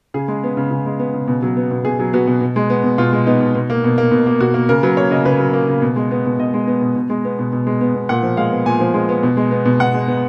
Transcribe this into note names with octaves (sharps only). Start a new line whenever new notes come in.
C#3 G#4
G#3
B3
C#3
C#3
G#3
B3
C#3
B2
F#3
B3
B2
B2 G#4
F#3
B3 F#4
B2
B2
G#3
B3
B2
B2 F4
G#3
B3 D#4
B2
B2
A#3
B2
A#3
B2
A#3
B2 F#4
A#3
C#3 A#4
F#3 B4
A#3 C#5
C#3 D#5
C#3 B4
F#3
A#3
C#3
B2
G#3
B3
B2
B2 D#5
G#3
B3
B2
B2
G#3
B3
B2
B2
G#3
B3
B2
A#2 F#5
F3
G#3 F5
B3
A#2 G#5
F3
G#3
B3
B2
G#3
B3
B2
B2 F#5
G#3
B3